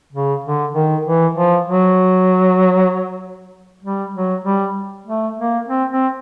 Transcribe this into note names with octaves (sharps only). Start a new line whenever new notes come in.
C#3
D3
D#3
E3
F3
F#3
G3
F#3
G3
A3
A#3
C4
C4